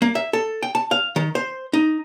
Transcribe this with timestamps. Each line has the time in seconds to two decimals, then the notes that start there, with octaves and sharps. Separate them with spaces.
0.02 A#3
0.15 E5
0.33 A4
0.63 G5
0.75 A5
0.91 F5
1.16 D#3
1.35 C5
1.73 D#4